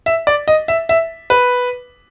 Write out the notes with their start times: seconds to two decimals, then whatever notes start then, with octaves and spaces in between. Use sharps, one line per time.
0.06 E5
0.27 D5
0.48 D#5
0.68 E5
0.89 E5
1.30 B4